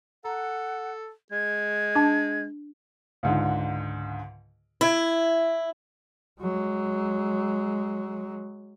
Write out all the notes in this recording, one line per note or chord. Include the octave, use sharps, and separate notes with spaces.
A4 F#5 A#5
G#3 G#6
D4 A5
C#2 G#2 D3
E4 B5 G#6 D7
F#3 G#3